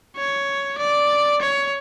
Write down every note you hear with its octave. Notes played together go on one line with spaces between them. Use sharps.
C#5
D5
C#5